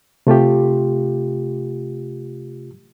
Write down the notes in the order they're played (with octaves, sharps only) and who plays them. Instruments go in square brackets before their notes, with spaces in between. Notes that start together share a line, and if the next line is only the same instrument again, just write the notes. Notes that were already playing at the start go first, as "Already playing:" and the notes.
[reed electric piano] C3 A3 F4 G4